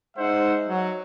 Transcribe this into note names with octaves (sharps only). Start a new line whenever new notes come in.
G#3 D#4 C5 E5 F#5
F#3